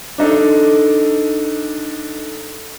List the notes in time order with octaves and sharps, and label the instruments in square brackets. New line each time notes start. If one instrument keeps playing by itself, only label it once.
[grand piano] D4 D#4 A4